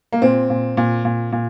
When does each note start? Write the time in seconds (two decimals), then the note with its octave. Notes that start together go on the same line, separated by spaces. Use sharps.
0.12 A#3
0.22 A#2 C4
0.50 A#2
0.77 A#2
1.05 A#2
1.32 A#2